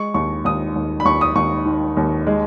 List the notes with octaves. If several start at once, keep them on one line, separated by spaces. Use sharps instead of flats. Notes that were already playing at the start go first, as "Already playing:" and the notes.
Already playing: G#3 C#6
D#2 C#6
D#2 D#6
D#2
B5
D#2 C#6
D#6
D#2 C#6
D#3
D#2
G#3